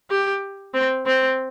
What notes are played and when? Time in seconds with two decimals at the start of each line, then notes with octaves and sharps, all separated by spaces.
0.10 G4
0.74 C4
1.06 C4